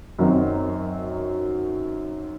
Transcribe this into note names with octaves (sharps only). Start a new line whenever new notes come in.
F#2 D#3 F#3 C4